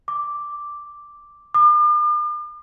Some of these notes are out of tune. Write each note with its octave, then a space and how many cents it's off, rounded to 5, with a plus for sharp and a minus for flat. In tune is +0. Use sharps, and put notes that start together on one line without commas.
D6 +0
D6 +45